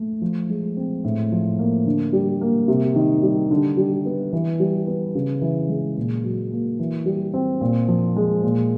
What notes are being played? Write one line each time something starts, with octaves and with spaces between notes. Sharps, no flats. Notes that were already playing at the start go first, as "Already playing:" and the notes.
Already playing: A3
F3
G#3
C4
A2
F3
A#3
D3
G3
A#3
C3
D#3
G3
D3
G3
B3
E3
G3
B3
C#3
E3
G#3
A#2
F#3
A#3
E3
G3
C4
A#2
F3
G#3
A#2